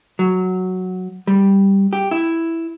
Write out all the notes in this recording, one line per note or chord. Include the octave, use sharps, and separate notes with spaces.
F#3
G3
G4
E4